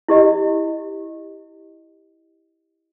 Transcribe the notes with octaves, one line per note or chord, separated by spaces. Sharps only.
E4 G4 D#5